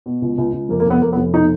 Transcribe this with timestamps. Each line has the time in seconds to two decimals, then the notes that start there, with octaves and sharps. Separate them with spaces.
0.06 B2
0.22 C#2
0.38 C#2
0.53 C#2
0.69 F1 A#3
0.80 A#3
0.86 F1 B3
1.02 F1 A#3
1.13 B3
1.17 F1
1.34 B2 D#4